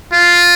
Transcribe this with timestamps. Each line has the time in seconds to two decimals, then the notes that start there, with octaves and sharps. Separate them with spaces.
0.13 F4